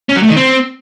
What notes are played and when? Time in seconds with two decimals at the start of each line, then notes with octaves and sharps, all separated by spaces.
0.09 C#4
0.16 F#3
0.23 A3
0.30 D#3
0.36 C4